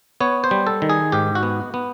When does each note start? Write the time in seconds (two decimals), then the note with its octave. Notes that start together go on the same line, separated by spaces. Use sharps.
0.21 B3 C#5
0.44 C5
0.51 G3
0.67 A4
0.82 D#3
0.90 G#4
1.12 G#2 G4
1.35 F#4
1.43 B3
1.74 B3